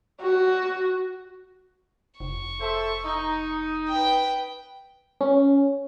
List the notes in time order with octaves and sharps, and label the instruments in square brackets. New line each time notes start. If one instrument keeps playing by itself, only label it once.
[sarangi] F#4
[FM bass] F1 [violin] C#6
[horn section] A4 C5 E5
D#4
[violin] B4 G5
[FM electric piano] C#4